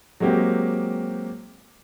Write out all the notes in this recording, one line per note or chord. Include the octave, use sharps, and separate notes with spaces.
F#3 G#3 A#3 C4 G4